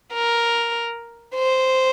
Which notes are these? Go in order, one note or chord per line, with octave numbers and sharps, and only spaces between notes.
A#4
C5